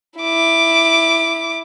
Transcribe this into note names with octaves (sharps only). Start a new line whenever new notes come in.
E4 D6